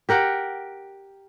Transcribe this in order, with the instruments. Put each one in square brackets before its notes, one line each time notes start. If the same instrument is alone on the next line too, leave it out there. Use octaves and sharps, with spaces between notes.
[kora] G4 A#4 F#5 G5